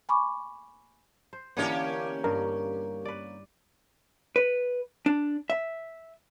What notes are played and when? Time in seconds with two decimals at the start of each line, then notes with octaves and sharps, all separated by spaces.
0.09 G#5 B5 C#6 D6
1.33 C5
1.57 D3 E3 A#3 B3 C#4 G4
2.24 G2 A#4
3.05 B4 D5
4.36 B4
5.06 D4
5.50 E5